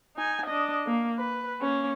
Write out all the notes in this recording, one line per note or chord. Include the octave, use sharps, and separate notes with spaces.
D#4 G#5
D4 D#5
A#3
B4
A#3 C#4